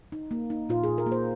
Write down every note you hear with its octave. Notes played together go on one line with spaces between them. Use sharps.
D#4
A#3
D#4
A#2 F4
A#2 G#4
A#4
A#3
C5